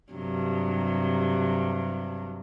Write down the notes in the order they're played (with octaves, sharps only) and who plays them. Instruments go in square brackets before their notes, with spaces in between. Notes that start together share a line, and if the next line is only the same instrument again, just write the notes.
[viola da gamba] G2 C3 F#3